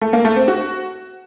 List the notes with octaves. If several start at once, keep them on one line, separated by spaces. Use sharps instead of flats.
A3
A#3
A3
C4
F#4